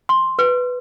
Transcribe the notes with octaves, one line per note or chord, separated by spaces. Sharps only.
C6
B4